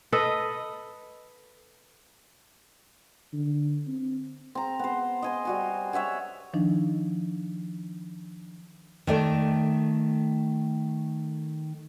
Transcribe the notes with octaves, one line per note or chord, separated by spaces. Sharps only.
A4 B4 D#5
D3
C4
C4 A#5
B3 C5
D#5 G#5 C6
G3 F#4 G#5
C#5 E5 F#5 G#5
D#3 F3 D4 D#4
D#3 A3 D5